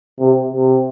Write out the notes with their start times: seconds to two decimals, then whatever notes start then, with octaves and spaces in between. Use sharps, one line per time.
0.19 C3
0.54 C3